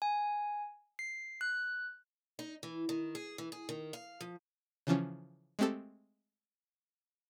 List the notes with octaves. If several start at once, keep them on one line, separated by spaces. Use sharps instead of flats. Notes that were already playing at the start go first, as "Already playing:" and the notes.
G#5
C7
F#6
D#4
E3
D#3
G#4
E3
G#4
D#3
F5
F3
C#3 E3 F3 C#4
G#3 A3 C4 G4 A4